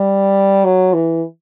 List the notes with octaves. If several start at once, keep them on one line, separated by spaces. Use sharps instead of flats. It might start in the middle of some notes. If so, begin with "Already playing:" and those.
Already playing: G3
F#3
E3